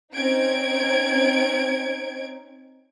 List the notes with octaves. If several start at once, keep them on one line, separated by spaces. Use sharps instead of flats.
C4 C#4 D#4 G#6 D7